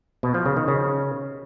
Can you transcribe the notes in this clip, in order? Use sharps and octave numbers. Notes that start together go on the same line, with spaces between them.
B2
F3
C#3
D#3
C#3